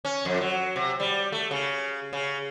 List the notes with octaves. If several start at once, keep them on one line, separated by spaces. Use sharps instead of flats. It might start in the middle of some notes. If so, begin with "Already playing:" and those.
C#4
F2
F#3
C3
G3
A3
C#3
C#3